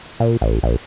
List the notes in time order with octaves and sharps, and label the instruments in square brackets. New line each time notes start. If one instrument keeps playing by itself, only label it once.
[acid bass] A#2
A1
A#1